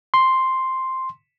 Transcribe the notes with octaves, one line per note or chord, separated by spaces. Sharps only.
C6